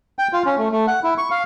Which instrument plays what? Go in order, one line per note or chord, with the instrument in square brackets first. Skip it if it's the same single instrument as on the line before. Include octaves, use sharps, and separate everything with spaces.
[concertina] G5
F4
C#4
A3
A3
F#5
E4
C#6
F5